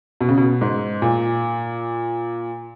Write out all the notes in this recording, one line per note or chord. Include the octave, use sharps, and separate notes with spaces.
B2
C#3
B2
G#2
A#2